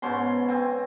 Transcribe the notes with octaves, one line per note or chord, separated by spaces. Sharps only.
G#2 B2 C#4 C6
C4 G#5